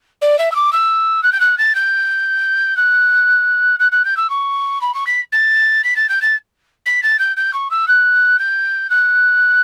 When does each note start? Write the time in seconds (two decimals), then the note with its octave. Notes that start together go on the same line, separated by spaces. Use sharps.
0.22 D5
0.39 E5
0.52 E6
0.56 D6
0.73 E6
1.23 F#6
1.32 G6
1.40 F#6
1.58 A6
1.75 G6
2.77 F#6
3.80 F#6
3.92 F#6
4.05 G6
4.17 E6
4.30 C#6
4.81 B5
4.94 C#6
5.07 B6
5.32 A6
5.84 B6
5.96 A6
6.09 G6
6.22 A6
6.86 B6
7.03 A6
7.19 G6
7.37 G6
7.54 C#6
7.71 E6
7.88 F#6
8.39 G6
8.90 F#6